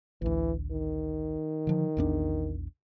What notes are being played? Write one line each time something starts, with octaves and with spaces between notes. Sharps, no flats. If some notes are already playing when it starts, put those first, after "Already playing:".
A1 D2 E3
D#3
D3 F3
A#1 E2 D4